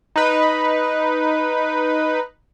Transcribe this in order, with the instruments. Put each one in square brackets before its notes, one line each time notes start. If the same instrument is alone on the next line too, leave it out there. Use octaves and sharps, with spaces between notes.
[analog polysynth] D#4 B4